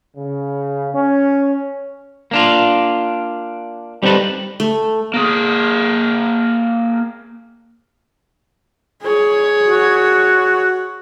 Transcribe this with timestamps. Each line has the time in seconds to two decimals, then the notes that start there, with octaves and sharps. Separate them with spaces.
0.17 C#3
0.93 C#4
2.31 A#3 D4 F4
4.03 G3 C4 D#4 A4 B4
4.60 A3
5.14 A#3 G#4
9.03 G#4 C#5
9.68 F#4